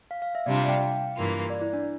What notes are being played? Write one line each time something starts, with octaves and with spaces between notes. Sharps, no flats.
F5
F5
E5
C3 G3 D4 F4 D5
F5
G5
F5
G2 E3 A#3 F4
D5
E4
D4